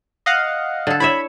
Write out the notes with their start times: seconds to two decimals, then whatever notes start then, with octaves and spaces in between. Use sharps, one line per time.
0.26 D#5 F5 F#5
0.87 D3 A4
1.00 E4 C#5 E5 B5